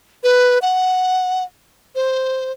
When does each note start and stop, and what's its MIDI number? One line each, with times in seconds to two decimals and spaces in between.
0.24 0.59 71
0.62 1.43 78
1.95 2.52 72